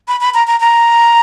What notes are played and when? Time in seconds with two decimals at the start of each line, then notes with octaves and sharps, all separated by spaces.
0.08 B5
0.21 B5
0.34 A#5
0.47 A#5
0.60 A#5